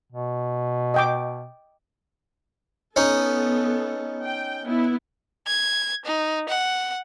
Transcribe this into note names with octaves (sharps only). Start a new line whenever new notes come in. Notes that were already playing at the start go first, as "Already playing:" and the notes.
B2
D#5 G5 D6
B3 C#4 D#4 A4
G5
B3 E4
G#6
D#4
F#5